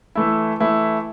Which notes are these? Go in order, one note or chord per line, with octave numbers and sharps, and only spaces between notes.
E3 A3 E4
E3 A3 E4